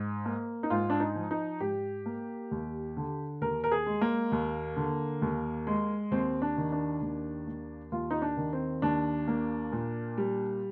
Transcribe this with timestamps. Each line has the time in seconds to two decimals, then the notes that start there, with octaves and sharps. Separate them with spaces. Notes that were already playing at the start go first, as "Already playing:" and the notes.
Already playing: G#2
0.25 A#3
0.63 D#4
0.70 G#2 F4
0.90 D4
1.00 D#4
1.15 F3
1.31 D#4
1.60 G#2 G4
2.06 A#3
2.51 D#2
2.97 D3
3.41 D#2 A#4
3.64 A#4
3.72 G#4
3.86 G#3
4.01 A#3
4.32 D#2
4.76 D3
5.22 D#2
5.67 G#3
6.11 D#2 C4
6.42 D4
6.57 D#3
6.72 D4
7.02 D#2
7.47 A#3
7.92 D#2 F4
8.11 D#4
8.22 D4
8.37 D#3
8.53 C4
8.82 D#2 D4
9.28 A#3
9.72 A#2
10.18 G3